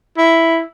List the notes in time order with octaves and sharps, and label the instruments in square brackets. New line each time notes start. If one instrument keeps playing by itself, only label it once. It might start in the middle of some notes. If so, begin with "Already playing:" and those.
[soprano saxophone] E4